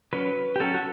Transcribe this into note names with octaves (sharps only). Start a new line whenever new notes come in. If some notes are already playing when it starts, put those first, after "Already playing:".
F#3 C#4 B4
G4
F#3 C#4 A4
F#4